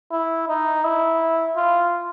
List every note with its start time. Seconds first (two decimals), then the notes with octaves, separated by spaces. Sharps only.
0.12 E4
0.49 D#4
0.84 E4
1.57 F4